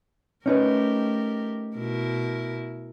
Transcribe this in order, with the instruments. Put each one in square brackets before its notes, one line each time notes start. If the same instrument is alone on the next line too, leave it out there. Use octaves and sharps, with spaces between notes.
[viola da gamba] A3 G4 A#4 [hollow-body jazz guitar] C#4 D#4 B4
[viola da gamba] B2 E4 A#4